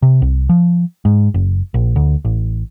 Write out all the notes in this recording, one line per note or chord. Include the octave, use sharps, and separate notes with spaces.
C3
C2
F3
G#2
F#1
A#1
D2
A1